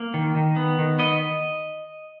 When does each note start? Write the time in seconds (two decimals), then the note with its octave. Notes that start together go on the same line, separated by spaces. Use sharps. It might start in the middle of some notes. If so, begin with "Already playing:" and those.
Already playing: A#3
0.14 D#3
0.35 D#3
0.56 B3
0.79 D#3
0.99 B3 D#5